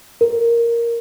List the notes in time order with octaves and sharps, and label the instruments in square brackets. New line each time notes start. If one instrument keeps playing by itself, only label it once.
[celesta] A#4